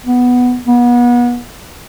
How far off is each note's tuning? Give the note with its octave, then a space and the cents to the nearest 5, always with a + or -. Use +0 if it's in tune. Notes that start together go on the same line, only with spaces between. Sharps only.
B3 +0
B3 -35